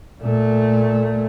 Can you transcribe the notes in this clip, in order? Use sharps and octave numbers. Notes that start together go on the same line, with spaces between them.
A#2 A3